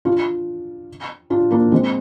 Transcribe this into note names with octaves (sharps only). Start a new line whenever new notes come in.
D4 F4
D4 F4
A#3 D4
G#3 C4